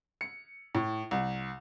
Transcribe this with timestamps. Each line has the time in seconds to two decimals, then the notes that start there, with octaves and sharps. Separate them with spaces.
0.21 C#7
0.75 A2
1.11 C2